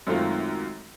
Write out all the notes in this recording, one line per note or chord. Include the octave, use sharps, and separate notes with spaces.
F#2 D#3 G#3 A3 C4 F4